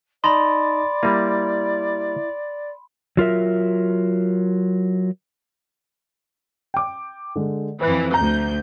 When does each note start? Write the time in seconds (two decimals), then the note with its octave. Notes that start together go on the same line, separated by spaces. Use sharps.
0.24 D#4 D5 D#5 A5 B5 C6
1.03 G3 A#3 E4
3.17 F#3 F4 A#4 E5
6.74 G5 D6
7.36 D3 G#3
7.81 F2 E3 B4 F#6
8.14 D2 A#5 G6